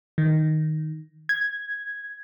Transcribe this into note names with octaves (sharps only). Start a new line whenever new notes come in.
D#3
G#6